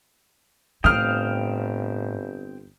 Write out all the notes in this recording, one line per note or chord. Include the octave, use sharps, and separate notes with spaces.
G1 A2 C4 F5 G5 D#6 F6